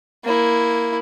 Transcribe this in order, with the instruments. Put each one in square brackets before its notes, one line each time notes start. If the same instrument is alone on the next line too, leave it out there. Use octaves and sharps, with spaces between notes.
[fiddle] A#3 E4